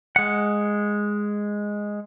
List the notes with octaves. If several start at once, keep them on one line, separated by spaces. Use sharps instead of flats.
G#3 F#5